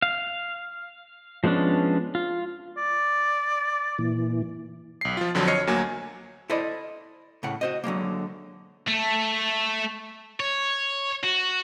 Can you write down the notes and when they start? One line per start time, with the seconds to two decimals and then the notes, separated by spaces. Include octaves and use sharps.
0.02 F5
1.44 F3 G#3 B3 C#4 D4
2.15 F4
2.77 D5
3.99 A#2 E3
5.01 B1 C7
5.17 F3 F4
5.35 F2 D3 F3 F#3
5.47 C#5 D#5 F6 G#6 C7 C#7
5.67 D2 F#3 A#3 G#5
6.50 E4 A4 C5 D5 D#5
7.43 A2 C#3 F#5
7.61 F#4 C5 D#5
7.84 D3 F#3 G#3 A#3
8.88 A3
10.40 C#5
11.24 F#4